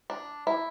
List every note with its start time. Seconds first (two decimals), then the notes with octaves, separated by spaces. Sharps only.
0.10 D4
0.47 E4